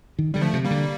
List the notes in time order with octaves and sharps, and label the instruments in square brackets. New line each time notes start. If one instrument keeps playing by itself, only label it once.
[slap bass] D#3
[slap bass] D3 [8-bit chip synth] G3
[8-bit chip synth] F3 A3
[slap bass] C3
[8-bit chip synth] G3 A#3
[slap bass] D3